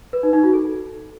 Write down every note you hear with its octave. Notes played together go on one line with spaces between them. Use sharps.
B4
D#4
D#4
F#4
A4